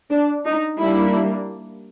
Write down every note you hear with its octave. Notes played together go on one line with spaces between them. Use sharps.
D4
D#4
G3 A#3 D4 E4